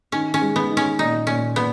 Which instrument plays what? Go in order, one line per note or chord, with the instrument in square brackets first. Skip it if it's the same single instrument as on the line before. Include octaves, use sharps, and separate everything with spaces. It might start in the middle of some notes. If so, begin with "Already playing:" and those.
[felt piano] D#3 [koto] C#4
[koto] C#4
[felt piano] G#3
[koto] B3
[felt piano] D#3
[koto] C#4
[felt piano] A#2 [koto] D#4
[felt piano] A#2 [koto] C#4
[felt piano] A#2 [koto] B3